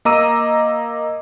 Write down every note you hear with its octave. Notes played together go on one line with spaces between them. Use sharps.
A#3 D#5 A#5 D6 E6 D#7